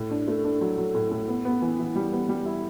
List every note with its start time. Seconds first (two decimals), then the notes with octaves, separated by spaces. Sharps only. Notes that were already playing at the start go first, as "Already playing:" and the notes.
Already playing: A2
0.11 D4
0.28 A3
0.44 D4
0.61 F#3
0.78 F#3
0.94 A2
1.11 A2
1.28 B3
1.45 B3
1.62 E3
1.79 E3
1.96 G3
2.12 B3
2.29 G3
2.46 E4